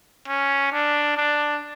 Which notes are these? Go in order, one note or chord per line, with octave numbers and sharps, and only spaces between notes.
C#4
D4
D4